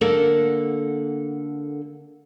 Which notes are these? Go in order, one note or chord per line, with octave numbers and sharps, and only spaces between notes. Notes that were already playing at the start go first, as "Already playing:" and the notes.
D3 A#3 A4 F#5